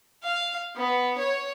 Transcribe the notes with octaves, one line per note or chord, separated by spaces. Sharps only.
F5
B3
C#5